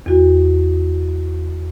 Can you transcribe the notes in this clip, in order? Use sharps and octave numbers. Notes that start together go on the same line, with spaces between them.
E2 F#4